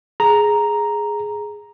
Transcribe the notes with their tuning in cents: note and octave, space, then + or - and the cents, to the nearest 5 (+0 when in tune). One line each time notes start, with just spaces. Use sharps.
G#4 +0 A#5 +0